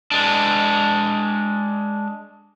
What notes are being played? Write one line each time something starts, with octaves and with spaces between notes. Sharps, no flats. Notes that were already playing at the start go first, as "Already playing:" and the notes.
G#3 D4